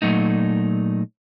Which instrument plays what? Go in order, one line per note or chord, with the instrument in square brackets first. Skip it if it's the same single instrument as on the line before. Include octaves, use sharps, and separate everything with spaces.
[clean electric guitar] A#2 E3 F#3 A3 D#4